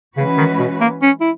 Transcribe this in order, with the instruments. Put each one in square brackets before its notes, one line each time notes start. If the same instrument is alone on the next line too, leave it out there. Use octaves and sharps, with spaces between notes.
[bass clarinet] C#3 [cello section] E3 G#3 C#4 F#4 B4
[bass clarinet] D#3
B2
A#3
C#4
E4